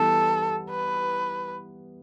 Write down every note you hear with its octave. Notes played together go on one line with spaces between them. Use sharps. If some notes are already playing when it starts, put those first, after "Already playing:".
Already playing: E3 G3 B3 A4
B4